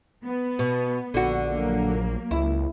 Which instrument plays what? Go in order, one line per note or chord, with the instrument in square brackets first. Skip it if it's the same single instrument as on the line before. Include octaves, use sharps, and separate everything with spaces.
[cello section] B3
[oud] B2
[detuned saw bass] A#1 [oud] D3 F#4
[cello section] F#3 A#3
[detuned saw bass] C#2 [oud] E4